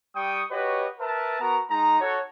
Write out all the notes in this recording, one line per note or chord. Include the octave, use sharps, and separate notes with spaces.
G3 G5 C#6 D#6
F#4 G4 B4 C#5 D#5
A#4 B4 E5 A5
B3 F#4 A#4 A#5
G#3 D#4 A#5
F#4 A4 C#5